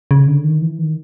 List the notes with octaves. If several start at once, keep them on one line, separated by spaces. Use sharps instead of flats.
C#3
D3
D#3
E3
D#3